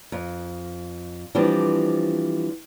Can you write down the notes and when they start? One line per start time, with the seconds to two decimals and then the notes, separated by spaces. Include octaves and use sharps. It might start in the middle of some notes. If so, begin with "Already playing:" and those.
0.12 F2
1.35 E3 F3 G3 C4 D4